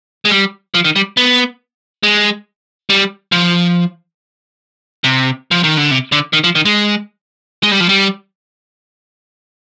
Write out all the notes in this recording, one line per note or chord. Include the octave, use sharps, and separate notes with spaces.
G#3
G3
F3
D#3
G3
B3
G#3
G3
F3
C3
F3
D#3
D3
C3
D3
D#3
F3
D#3
G#3
G#3
G3
F3
G3